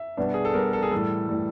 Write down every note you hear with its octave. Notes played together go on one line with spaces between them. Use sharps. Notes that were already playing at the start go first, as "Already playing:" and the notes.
Already playing: E5
B2 G3 B3 D4
G#4
A4
B2 G3 B3 D4 A#4
A4
G#4
A2 E3 G3 A4
A2 E3 G3